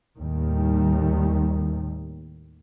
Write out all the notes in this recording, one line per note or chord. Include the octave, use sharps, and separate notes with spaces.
D#2 A2 D#3 G3